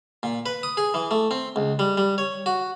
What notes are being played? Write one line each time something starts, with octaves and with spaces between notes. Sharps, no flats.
A#2
B4
D#6
G#4
E3
A3
C4
C#2
G3
G3
C#5
F#4